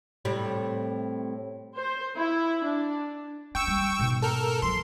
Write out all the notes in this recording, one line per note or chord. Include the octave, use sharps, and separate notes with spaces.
A2 C3 G3
C5
E4
D4
C#4 G5 C#6 E6
G3
G#2 B2
A4 A#4
F3 F#3 C6